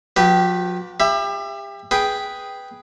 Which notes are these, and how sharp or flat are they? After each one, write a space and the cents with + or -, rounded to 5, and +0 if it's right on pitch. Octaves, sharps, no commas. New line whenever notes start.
F3 +45 G4 -20 B4 +0
G4 +30 E5 +25 B5 +0
G#4 +0 B4 +0 G5 +0